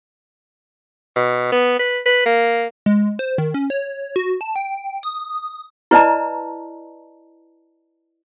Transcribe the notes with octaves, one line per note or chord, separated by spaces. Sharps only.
B2
B3
B4
B4
A#3
G#3
C5
D#3
C#4
C#5
F#4
A5
G5
D#6
E4 B4 D5 D#5 A5 A#5